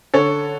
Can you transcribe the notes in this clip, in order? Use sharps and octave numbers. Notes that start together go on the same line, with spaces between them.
D3 A4 C#5